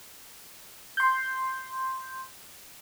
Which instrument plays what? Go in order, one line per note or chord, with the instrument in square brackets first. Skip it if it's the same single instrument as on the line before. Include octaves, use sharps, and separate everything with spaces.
[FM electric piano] C6 G6